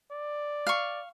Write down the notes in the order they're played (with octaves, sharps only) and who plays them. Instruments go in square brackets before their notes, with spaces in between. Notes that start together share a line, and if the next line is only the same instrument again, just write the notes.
[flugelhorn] D5
[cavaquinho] F5 C#6